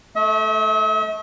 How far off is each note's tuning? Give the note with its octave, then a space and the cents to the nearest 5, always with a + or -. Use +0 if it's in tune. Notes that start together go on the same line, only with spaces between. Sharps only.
A3 -10 E5 -45